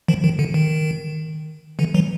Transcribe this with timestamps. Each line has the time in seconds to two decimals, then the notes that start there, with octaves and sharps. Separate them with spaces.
0.08 D#3 F3
0.24 D#3
0.39 D3
0.54 D#3
1.79 D3 E3
1.94 E3 F#3